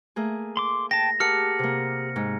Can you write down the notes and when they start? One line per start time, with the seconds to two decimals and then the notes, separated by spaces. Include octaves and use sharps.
0.16 A3 A#3 G#4
0.57 C6 D6
0.91 G5 A5 A#6
1.20 G4 G#4 A#4 F#5 A5 F6 C#7
1.59 C3 A#3
2.16 G#2